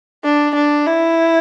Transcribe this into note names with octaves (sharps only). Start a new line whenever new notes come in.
D4
D4
E4